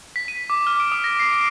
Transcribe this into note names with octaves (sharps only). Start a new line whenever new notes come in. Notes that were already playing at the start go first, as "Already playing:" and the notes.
B6
D#7
D6
F6
D7
D#6
A#6
C7
D7